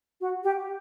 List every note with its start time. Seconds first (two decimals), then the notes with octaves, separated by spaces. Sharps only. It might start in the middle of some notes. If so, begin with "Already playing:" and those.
0.21 F#4
0.44 G4